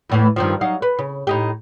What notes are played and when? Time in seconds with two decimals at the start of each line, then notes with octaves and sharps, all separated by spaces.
0.09 E2 A2 E3
0.36 G2 D#3 F3
0.61 F#3 D#4 F5
0.82 B4
0.99 C#3
1.27 A2 D#4 G4